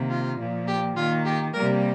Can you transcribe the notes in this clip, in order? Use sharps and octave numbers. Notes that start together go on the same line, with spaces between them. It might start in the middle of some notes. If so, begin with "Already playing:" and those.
Already playing: C3 D#3 A#3
F4
A#2 F3 A#3
G4
D#3 A#3 F4
G4
C3 G3 A#3 A#4